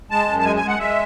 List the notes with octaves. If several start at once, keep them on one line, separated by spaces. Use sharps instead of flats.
G#3 A5
F#2
A5
G#3 G#5
G#5
G#3
F#5
G#3 E5